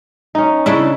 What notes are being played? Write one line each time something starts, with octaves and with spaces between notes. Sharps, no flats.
C#4 D#4
C#3 D4 E4